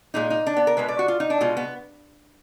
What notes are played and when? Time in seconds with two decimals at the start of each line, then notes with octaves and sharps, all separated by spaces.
0.14 A#2 G#3 D#4
0.30 D#4
0.47 D4
0.57 B3
0.67 A#4
0.77 B2 G#3 B4
0.88 D5
0.99 F#4
1.08 F4
1.20 D#4
1.30 D4
1.41 B2 G#3 F4
1.57 B3